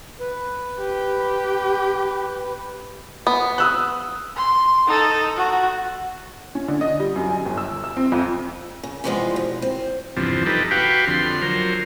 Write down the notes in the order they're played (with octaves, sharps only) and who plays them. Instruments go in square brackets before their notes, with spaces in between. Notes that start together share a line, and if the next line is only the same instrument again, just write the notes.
[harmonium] B4
[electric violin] G4
[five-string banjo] B3
[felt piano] D#6 E6 F#6
[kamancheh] C6
D#4 A4
F#4
[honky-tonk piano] C#4
D3
D#5
G3
F#2
G#5
G1
E6
E6
C4
F2
[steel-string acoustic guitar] C#3
C3 E3 F3 G3 G#3 B3
B2
C4
[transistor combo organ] E2 G2 C3 F3
D#4 G4 A4 B4
F#4 G4 B4 F5 G5
F2 D3 C6
F#3 F4 A#4 C5